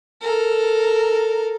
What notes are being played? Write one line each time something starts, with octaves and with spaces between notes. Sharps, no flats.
A4 A#4